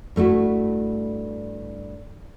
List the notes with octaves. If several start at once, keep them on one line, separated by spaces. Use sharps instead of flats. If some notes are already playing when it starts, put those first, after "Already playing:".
G2 A3 E4 F#4